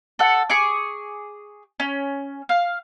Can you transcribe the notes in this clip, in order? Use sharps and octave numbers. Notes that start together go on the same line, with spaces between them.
A4 F#5
G#4 G#5 C#6 D6
C#4
F5